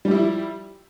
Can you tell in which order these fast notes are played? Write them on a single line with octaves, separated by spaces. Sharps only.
G3 G4 E4 F3